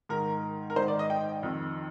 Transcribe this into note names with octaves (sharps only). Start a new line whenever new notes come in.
G#2 D#3 A#4
A#4
G#2 D#3 C5
D5
D#5
G5
F2 D#3